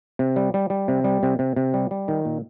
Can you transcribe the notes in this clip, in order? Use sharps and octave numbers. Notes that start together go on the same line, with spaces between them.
C3
G3
G3
G3
C3
G3
C3
C3
C3
G3
G3
D#3
A#2